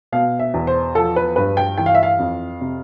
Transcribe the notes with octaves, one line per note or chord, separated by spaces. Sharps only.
B2 F5
E5
E2
C5
F3 A4
B4
G2 B4
G5
E3 G5
F5
E5
F5
F2
C3